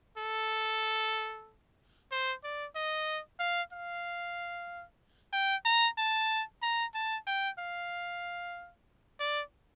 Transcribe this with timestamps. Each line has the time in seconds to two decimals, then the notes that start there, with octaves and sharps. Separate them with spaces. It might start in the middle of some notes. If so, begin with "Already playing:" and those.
0.18 A4
2.12 C5
2.44 D5
2.76 D#5
3.40 F5
3.73 F5
5.33 G5
5.65 A#5
5.98 A5
6.63 A#5
6.95 A5
7.27 G5
7.59 F5
9.20 D5